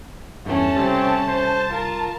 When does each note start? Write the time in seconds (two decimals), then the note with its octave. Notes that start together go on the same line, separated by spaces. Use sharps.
0.46 E2 G2 A3 C#4 A5
0.76 C3 G3 C4
1.27 C5
1.71 F4 A#4